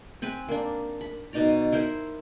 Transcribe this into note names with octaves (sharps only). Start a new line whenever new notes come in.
C4 B4 G#5 B5
A#3 D4
B5
B2 D#4 D5 A#5
E4 A#4 C5